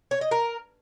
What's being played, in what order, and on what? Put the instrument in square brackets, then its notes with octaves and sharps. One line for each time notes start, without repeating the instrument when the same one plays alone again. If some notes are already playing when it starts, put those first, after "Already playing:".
[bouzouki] C#5
D#5
A#4